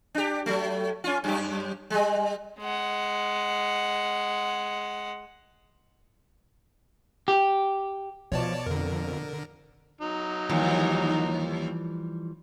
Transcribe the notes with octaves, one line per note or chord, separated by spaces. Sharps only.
D4 G4
F#3 A3
C#4 F4
F#2 G4
G3 G#3
G#3 F#5
G4
B2 F3 C#5 D5 A5
F2 D3 A#4
F#3 D#4
D#2 E3 F3 G3